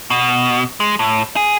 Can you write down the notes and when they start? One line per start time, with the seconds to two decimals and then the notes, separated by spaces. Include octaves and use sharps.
0.10 B2
0.80 G#3
0.99 A2
1.36 G#4